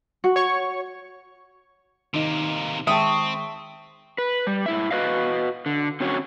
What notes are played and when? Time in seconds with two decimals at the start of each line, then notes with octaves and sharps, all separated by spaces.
0.24 F#4
0.36 C#5 C#6
2.14 C3 D#3 A#3 D#4
2.87 D#3 G#3 C4 E5 G5 A5 C#6 D#6
4.18 B4
4.47 G3
4.66 G#2 E4 E5
4.91 F#4 B4 D#5 F5
5.66 D3
6.00 D3 C4 C#4 F#4 C#5